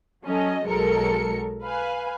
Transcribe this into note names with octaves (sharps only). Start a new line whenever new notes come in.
F#3 C#4 A4 D#5
B1 F#3 G#3 A4 A#4 C#7
B4 F5 G#5